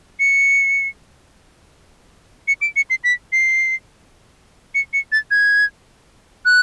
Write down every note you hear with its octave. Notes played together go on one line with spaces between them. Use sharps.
C#7
C#7
D7
C#7
C7
B6
C7
C#7
C#7
A6
G#6
F#6